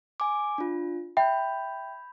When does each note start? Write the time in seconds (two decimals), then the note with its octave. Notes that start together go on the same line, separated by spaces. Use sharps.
0.20 G#5 D6
0.58 D4 F4
1.17 E5 G5 B5 G6